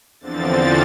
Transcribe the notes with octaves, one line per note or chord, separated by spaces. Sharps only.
E2 D3 F3 C4 A6